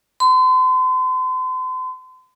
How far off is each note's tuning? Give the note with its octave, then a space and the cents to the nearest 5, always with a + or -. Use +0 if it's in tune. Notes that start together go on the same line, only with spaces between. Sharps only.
C6 -40